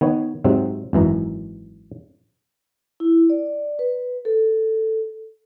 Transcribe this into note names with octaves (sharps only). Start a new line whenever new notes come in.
D#3 B3 C#5
G#2 C3 F#3 C4
G#1 F#2 E3 A#5
E4
D5
B4
A4